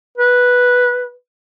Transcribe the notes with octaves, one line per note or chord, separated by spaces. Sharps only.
B4